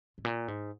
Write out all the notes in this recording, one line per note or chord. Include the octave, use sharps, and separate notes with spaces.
G#2
A#2
G#2